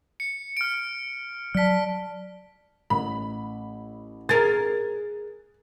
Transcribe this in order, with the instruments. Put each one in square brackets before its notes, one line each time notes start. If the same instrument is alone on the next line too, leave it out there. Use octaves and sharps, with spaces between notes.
[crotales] C#7
F6 D7
[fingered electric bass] F#3 [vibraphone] D5 A5 [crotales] F6 B6
[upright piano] A1 [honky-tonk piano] B5
[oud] G#4 A#4 [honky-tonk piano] A6